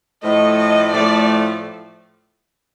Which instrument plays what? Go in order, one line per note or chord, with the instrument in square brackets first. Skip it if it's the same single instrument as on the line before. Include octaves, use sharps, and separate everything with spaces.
[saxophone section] A2 F3 A3 [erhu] D#5
[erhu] D#5
[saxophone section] A2 F3 A3 [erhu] D5